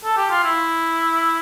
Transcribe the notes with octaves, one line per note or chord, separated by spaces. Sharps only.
A4
G4
F4
E4